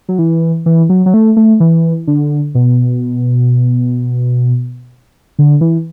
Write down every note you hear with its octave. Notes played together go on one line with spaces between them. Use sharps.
F#3
E3
E3
F#3
F#3
A3
A3
E3
D3
B2
D3
E3